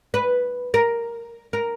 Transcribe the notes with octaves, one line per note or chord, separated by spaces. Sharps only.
B4
A#4
A#4